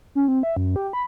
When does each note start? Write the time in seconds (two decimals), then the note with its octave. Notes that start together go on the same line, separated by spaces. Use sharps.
0.15 C#4
0.28 C4
0.43 E5
0.57 F#2
0.76 G4
0.93 B5